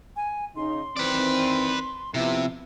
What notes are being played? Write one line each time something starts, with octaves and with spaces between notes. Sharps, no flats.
G#5
C#3 C#4 D#4 C6
D#3 E3 C4 B4 D5
C3 F3 B3 E4